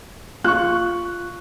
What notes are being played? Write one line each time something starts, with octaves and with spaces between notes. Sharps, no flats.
F4 C#6 F#6